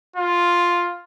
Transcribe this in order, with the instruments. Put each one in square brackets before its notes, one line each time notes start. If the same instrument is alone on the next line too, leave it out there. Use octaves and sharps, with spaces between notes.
[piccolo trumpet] F4